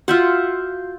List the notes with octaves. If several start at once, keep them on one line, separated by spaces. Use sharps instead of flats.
F4 F#4 E5 F#5 G6